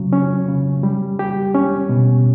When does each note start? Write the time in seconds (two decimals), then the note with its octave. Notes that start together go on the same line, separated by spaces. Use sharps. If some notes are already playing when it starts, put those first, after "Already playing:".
Already playing: C#3 F#3
0.13 C#4
0.48 C#3
0.83 G3
1.19 G4
1.55 C#4
1.89 B2